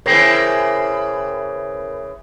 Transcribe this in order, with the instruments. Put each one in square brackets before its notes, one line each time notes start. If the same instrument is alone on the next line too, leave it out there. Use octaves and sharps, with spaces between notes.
[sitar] C#3 E3 [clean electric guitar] A#4 C5 G5